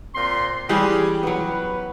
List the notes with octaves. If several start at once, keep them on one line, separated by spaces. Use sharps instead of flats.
A#2 C4 C6
E3 G3 C#4 G4 G#4
F#3 B3 B4